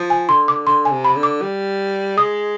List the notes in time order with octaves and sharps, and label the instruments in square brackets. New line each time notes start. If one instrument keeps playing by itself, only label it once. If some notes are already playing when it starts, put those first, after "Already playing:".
Already playing: [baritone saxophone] F3
[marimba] G#5
[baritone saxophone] D3 [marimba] C6
[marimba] D6
[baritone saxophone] D3 [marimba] C6
[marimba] G#5
[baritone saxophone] C3
[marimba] B5
[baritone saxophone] D3
[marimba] D6
[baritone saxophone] G3
[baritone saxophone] G#3 [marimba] D#6